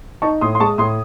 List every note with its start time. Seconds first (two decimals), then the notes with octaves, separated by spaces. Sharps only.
0.22 D#4 A5 C#6
0.41 A2 C6 D#6
0.55 C6
0.60 G#3 A5 C#6
0.78 A2 C6 D#6